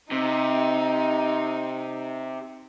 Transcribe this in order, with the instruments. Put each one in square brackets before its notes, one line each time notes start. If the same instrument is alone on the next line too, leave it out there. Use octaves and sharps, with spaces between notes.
[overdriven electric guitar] C3 [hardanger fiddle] D#4